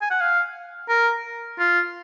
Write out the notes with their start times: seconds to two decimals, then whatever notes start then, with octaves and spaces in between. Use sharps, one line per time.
0.02 G#5
0.11 F#5
0.21 F5
0.89 A#4
1.59 F4